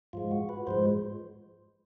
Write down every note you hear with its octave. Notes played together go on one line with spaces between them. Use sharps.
G#2 F3 G#3 F4
F#4
B4
G#2 F3 G#3 C5